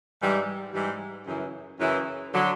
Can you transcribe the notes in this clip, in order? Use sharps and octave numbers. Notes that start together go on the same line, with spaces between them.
G#2 E3 G3
G#2 E3 G3
F#2 C#3 E3
F#2 C#3 E3
D3 F#3